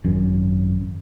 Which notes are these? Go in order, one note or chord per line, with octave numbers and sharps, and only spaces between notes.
G#1 F#2